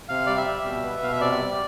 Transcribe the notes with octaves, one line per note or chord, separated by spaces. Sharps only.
C3 F5
G3 D5
E5
G3
B2
B3
B2 F5
E5
C3 D5
G3